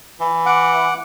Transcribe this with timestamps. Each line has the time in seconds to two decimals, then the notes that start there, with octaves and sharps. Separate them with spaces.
0.20 E3
0.46 F#5 D6